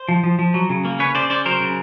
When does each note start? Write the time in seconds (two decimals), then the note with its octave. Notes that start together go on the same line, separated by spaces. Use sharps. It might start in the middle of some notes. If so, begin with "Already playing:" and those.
Already playing: C5
0.09 F3
0.24 F3
0.39 F3
0.54 F#3
0.70 C#3
0.85 A#3
0.99 C#4 B4 C#5
1.15 C#3 C5 D5
1.30 C#4 C5 D5
1.45 F#3 A#4 C5
1.61 C#3